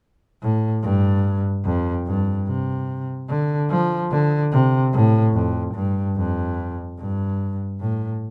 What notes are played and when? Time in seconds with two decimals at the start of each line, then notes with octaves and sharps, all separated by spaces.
0.42 A2
0.83 G2
1.64 F2
2.06 G2
2.47 C3
3.29 D3
3.70 F3
4.11 D3
4.52 C3
4.93 A2
5.34 F2
5.74 G2
6.16 F2
6.99 G2
7.80 A2